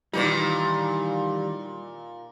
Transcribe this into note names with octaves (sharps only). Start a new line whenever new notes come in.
A#2 D#3 E3 G3 D#4